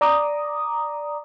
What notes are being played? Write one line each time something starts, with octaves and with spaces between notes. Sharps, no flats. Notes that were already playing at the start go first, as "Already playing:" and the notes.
D5 A#5 D6 D#6